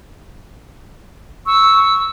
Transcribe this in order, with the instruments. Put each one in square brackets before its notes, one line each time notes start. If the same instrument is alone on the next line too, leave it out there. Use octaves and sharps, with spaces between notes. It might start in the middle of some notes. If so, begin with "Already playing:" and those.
[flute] C#6 [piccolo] E6